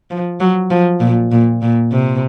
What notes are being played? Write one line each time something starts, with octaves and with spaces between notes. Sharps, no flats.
F3
F#3
F3
A#2
A#2
A#2
C3